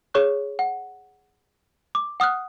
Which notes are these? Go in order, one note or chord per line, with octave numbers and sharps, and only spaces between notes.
G#4 C#5 C#6 F#6
F#5
D6
F#5 D#6 F6 F#6